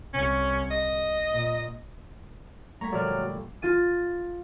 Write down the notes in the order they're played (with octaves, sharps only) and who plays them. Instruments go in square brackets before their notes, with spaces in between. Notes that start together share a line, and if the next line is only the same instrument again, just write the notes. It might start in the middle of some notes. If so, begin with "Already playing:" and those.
[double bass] C2 [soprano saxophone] C#4
[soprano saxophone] D#5
[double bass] A#2
[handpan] G3 A3 A#3 [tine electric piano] A#5 [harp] C#6 G#6 B6
[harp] G1 A#2 F3 [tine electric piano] F#3 F6 [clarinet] D5
[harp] F4 A6 D#7